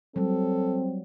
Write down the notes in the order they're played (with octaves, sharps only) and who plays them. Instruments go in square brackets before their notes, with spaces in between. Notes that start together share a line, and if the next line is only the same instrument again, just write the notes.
[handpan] F#3 G3 [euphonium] C4 [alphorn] A4